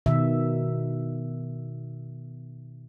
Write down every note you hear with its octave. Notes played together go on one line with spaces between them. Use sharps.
B2 D#3 E5